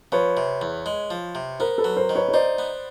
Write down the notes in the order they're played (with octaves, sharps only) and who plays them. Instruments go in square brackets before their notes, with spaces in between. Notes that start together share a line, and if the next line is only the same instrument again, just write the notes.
[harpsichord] F3 [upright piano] B4 C#5
[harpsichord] C3
E2
G#3
F3
C3
[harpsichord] B3 [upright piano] A#4 C5
[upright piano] A4 B4
[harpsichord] F#3
[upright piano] A#4 C5
[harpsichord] D#3
[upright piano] B4 C#5
C#5
[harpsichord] D#4 [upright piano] C5 D5
[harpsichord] B3